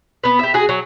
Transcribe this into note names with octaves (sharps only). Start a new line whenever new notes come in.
B3 B4
G4 E5
F#4 G#4
F#3